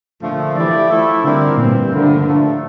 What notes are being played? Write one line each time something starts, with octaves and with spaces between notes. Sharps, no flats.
A#2 D3 F3 A3
E3 F3 A3 E4 G4 D5
F3 A3 E4
D3 G3 C4 E4 A#4 D5
G2 A#2 E3 G3 C4
G2 D3 F3 A3 E4 A#4
A2 F3 A3